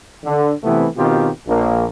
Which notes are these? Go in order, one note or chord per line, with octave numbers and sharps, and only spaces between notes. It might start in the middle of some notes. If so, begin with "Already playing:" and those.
D3
C3 E3 A3 B3 C4 E4
B2 D#3 C4 F4 G4
A#1 A#3